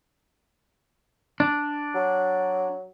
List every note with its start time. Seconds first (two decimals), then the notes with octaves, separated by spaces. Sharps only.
1.40 D4
1.94 F#3